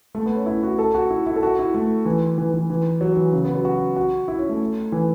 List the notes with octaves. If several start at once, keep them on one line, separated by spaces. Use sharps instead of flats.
A3
B3
C#4
E4
F#4
A4
F#4
E4
E4
A4
F#4
E4
A3
E3
E3
E3
E3
F#3
E3
C#3
B3
F#3
F#4
F#4
E4
C#4
A3
E3